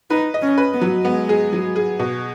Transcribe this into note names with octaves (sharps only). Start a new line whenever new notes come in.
D#4 B4
D#5
C#4
B4
B3
F#3
G#3 B3
G#4
F#3
G#4
B2